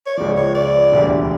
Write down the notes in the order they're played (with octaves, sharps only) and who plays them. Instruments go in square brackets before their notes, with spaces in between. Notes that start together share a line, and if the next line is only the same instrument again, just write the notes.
[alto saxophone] C#5
[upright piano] C#2 C#3 F3 [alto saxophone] D5
[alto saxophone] C#5
D5
[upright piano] E1 D2 D3 G3